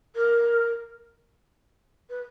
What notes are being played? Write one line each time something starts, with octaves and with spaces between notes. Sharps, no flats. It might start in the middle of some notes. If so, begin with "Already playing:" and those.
A#4
B4